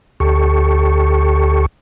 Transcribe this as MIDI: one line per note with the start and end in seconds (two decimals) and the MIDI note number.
0.20 1.66 38
0.20 1.66 67
0.20 1.66 69
0.20 1.66 85